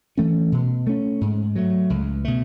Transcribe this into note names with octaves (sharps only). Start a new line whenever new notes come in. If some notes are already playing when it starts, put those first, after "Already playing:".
E3 A3 C#4
B2
A3 C#4
G#2
F#3 A3
C#2
B2 A3